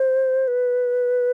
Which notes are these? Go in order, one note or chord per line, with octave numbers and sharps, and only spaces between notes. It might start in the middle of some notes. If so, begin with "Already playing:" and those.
Already playing: C5
B4